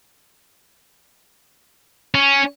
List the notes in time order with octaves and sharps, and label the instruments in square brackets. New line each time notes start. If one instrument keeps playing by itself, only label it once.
[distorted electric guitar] C#4